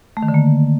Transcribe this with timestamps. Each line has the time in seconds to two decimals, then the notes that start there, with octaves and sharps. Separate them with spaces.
0.17 A3
0.23 D#3
0.28 D3
0.34 A#3